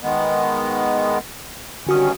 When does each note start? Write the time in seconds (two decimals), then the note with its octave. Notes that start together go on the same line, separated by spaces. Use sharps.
0.02 D#3 G#3 B3
1.87 G2 D3 D#3 C#4 F#4 D#6